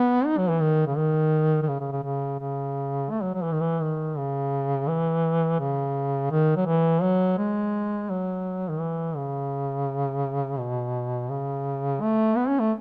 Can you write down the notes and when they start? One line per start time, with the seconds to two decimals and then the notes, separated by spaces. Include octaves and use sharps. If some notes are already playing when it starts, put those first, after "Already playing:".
Already playing: B3
0.26 D#4
0.38 F#3
0.50 E3
0.61 D#3
0.87 C#3
0.97 D#3
1.62 D#3
1.68 C#3
1.80 C#3
1.92 C#3
2.04 C#3
2.40 C#3
3.11 A3
3.23 F#3
3.34 F#3
3.43 E3
3.52 D#3
3.61 E3
3.82 D#3
4.17 C#3
4.88 E3
5.60 C#3
6.31 D#3
6.57 F#3
6.66 E3
7.02 F#3
7.38 G#3
8.10 F#3
8.69 D#3
8.80 E3
9.16 C#3
10.59 B2
11.29 C#3
12.01 A3
12.37 B3
12.48 C#4
12.60 A3